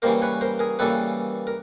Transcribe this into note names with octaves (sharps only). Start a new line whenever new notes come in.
C#3 E3 G3 A#3 A#4 C5
B4 C#5
A#4 C5
G#4 A#4
C#3 E3 G3 A#3 A4 B4
A#4